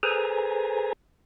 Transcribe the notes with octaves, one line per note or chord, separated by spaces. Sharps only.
G#4 A4 B4 C5 G#5 A#5